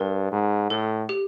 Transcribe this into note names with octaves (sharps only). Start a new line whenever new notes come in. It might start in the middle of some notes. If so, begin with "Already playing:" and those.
Already playing: G2 A#4
G#2
A2 A4
G4